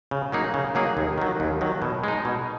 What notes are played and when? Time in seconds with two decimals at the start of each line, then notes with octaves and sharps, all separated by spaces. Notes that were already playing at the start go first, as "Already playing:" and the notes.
0.11 C#3
0.32 F#3 A#3 D#4 G#4
0.54 C#3
0.75 F#3 A#3 D#4 G#4
0.97 D#2
1.18 D#3 F#3
1.40 D#2
1.61 D#3 F#3
1.82 B2
2.04 G#3 D#4
2.25 B2